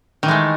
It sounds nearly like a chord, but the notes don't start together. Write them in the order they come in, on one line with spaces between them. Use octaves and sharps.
D#3 E3 G#3 A3